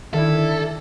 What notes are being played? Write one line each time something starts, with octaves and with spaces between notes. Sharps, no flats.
D3 D#3 E4 A4 D5 E5